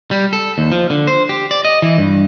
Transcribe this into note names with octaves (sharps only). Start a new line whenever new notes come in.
G3
A4
D#2
F3
D3
C5
G4
D5
D#5
E3
G2